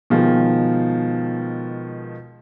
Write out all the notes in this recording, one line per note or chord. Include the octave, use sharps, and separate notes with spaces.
B2 D#3 F3 G#3